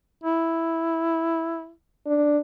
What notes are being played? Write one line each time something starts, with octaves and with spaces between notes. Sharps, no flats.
E4
D4